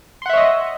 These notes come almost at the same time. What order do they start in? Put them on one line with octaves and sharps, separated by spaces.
C6 F#5 E5 C#5 D#5